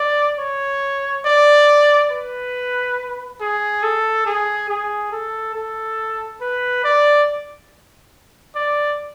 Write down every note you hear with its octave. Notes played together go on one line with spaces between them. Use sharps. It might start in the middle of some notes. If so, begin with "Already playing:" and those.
Already playing: D5
C#5
D5
B4
G#4
A4
G#4
G#4
A4
A4
B4
D5
D5